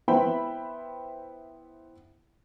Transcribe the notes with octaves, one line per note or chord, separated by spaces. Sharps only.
B3 E4 C5 E5 G5 B5